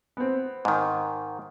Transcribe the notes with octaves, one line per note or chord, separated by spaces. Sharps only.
B3 C4
G#2 D#3